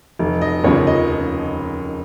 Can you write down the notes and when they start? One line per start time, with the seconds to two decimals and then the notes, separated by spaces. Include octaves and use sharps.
0.19 F1
0.42 D#5
0.64 D#2 C#3 F3 C#5
0.87 D#5